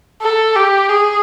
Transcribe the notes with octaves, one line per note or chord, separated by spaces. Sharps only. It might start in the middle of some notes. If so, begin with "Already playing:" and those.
A4
G4
G#4